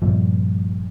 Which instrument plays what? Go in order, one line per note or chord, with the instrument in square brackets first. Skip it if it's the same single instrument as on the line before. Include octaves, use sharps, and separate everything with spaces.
[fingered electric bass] G2 A#2 F3